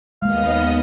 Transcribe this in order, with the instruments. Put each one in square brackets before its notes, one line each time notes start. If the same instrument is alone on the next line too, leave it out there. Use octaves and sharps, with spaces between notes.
[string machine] D#2 B3 D#5 [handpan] G#3 A#3 [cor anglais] F5